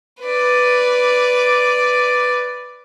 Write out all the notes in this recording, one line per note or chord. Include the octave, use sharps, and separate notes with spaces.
B4 D5